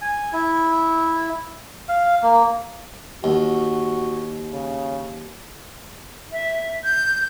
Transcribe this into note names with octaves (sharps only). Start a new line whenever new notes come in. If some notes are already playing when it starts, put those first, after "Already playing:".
G#5
E4
F5
A#3
D#2 F#4
C#3
E5
G6